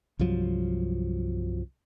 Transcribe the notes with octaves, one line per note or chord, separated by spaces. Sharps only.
C2 G2 F3 F#3